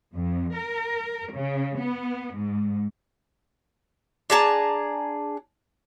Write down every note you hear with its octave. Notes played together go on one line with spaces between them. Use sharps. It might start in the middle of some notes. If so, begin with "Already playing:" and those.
F2
A#4
C#3
B3
G#2
D4 G#4 A5 A#5